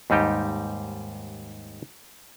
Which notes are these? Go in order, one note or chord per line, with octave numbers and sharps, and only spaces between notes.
D#2 G#2 G3 D#4 G4